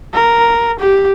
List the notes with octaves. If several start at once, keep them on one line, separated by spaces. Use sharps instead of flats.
A#4
G4